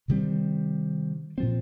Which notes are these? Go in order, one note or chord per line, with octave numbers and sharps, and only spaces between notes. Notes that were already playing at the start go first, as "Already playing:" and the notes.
C3 D#3 G3 C4
A#2 F3 C4